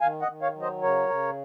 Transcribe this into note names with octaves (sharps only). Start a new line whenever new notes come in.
D#3 F5 G#5
D#5 F#5
D#3
C#5 F5
F#3
C5 D#5
C#3 A#4 C#5
C#3